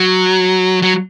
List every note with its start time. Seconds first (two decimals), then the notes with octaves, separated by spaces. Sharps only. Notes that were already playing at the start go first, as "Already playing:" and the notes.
Already playing: F#3
0.82 F#3